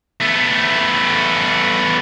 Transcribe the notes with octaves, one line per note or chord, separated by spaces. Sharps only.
A3 B3